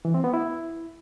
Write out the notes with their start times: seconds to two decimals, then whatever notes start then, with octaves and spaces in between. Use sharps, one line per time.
0.05 E3
0.14 C4
0.24 B3
0.34 E4